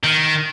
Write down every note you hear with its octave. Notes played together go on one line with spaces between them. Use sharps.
D#3